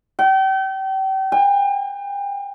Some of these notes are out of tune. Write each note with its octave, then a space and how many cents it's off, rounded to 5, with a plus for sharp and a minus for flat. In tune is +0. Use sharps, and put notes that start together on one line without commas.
G5 -35
G5 +45